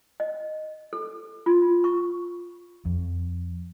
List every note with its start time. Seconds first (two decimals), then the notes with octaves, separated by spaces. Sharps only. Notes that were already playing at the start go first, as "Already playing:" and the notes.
0.20 D#5
0.93 A4
1.46 F4
1.84 C#6
2.85 F2